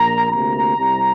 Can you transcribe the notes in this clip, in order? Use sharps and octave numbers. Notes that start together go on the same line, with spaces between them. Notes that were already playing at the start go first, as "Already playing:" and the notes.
Already playing: A#1 A#2 A#3 A#5
D2 C3 A#3 A#5
C2 C3 G3